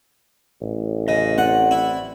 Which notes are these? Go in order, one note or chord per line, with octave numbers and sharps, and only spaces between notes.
A1
C#3 D#5
C4 D5 F#5
E4